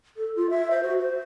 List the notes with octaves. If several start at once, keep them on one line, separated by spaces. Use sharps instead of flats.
A4
F4
E5
C5
F#4
C5